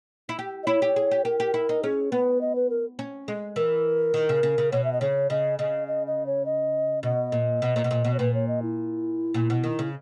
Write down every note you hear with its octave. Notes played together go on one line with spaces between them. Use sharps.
E4
G4
D#5
E4 C#5
G4
G#4
G4
G4 A#4
G4
E4
D#4
C#4 G#4
B3 B4
D#5
B4
A#4
C#4
G#3
E3 A#4
D#3
C#3
C#3
C#3
B2 C#5
E5
D#5
C#3 C#5
C#3 D#5
C#3 D#5
D#5
D#5
C#5
D#5
B2 D#5
A#2
B2
A#2
B2
A#2
B2
C#5
A#2 B4
C#5
D#5
E4
A#2
B2
D#3
C#3